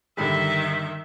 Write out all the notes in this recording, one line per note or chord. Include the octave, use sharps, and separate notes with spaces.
G2 D3 D#3 E5 B5 B6